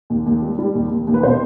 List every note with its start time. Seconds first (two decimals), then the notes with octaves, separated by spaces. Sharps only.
0.10 D#2
0.26 D#2
0.42 G3
0.59 G3
0.75 D#2
0.91 D#2
1.07 D#2
1.14 B4
1.23 B2 C5